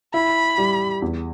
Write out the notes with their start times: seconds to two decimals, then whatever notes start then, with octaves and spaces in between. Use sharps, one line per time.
0.14 E4 B5
0.58 G3
1.02 E2